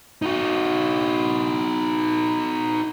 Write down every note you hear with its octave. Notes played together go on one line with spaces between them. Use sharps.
D#4 F#4